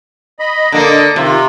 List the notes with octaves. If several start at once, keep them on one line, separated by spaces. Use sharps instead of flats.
D#5 B5
D3 A#3 D#5
C3 D#3 F4